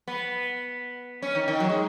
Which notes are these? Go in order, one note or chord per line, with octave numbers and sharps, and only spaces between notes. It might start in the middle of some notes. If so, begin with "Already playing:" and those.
B3
C#4
D#3
D#3
F#3
G#3